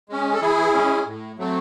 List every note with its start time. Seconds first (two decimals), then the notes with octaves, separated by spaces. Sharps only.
0.09 G#3 C#4
0.34 A4
0.41 E3 E4 G#4
0.74 G#3 C#4
1.07 A2
1.39 F#3 A3 C4